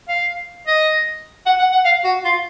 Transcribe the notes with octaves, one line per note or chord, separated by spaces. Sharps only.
F5
D#5
F#5
F#5
F#5
F5
F#4
F4